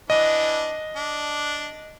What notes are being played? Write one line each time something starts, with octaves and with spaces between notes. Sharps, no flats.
E3 D4 D#5
D4